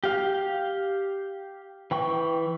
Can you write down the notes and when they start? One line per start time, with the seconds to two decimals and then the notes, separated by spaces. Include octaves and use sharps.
0.04 G4 F5
1.91 E3 G5 C#6